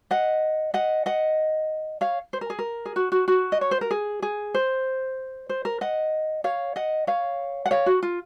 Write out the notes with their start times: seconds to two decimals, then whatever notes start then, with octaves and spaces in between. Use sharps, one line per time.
0.11 D#5 F#5
0.74 D#5 F#5
1.06 D#5 F#5
2.01 C#5 F5
2.33 C5
2.41 A#4
2.50 G#4
2.59 A#4
2.86 G#4
2.96 F#4
3.12 F#4
3.28 F#4
3.52 D#5
3.61 C#5
3.71 C5
3.81 A#4
3.91 G#4
4.22 G#4
4.55 C5
5.49 C5
5.65 A#4
5.81 D#5 F#5
6.44 C#5 F5
6.76 D#5 F#5
7.07 C#5 F5
7.66 F#5
7.71 C#5 F5
7.86 F#4
8.03 F4